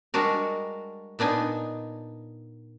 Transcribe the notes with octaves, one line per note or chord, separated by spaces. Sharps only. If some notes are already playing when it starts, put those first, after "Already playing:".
G3 G#3 D4 F#4 A#4
A#2 B3 D4 D#4 G#5